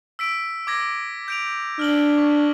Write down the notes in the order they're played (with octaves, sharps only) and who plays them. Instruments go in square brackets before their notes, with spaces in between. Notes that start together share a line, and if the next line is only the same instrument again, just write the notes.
[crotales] E6 B6 D7
D6 G#6 A#6
G6 D7 F7
[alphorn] D4 [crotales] F6 F#7 G7
[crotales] C#6